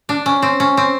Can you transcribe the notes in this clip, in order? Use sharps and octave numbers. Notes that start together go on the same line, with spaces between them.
D4
C#4
C4
C#4
C4